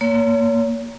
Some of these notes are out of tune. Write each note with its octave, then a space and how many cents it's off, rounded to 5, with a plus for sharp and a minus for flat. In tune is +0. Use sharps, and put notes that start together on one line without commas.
A#3 +0 C#5 +30